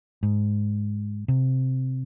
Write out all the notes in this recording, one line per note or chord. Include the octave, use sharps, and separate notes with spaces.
G#2
C3